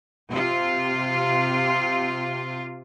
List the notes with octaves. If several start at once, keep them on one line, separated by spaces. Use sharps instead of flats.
C3 F4